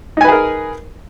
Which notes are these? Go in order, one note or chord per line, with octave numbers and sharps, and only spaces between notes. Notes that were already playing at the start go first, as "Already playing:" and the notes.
D#4 G#4 A#4 B4 G#5